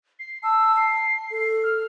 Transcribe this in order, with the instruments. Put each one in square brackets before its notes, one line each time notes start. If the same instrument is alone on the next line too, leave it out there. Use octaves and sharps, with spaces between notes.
[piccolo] C7
[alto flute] A5 [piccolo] E6
[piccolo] C7
[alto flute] A4
[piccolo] F6